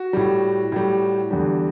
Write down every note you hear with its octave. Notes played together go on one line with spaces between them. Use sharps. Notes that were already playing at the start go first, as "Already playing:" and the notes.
Already playing: F#4
A2 G3
A2 G3
E2 D3 G3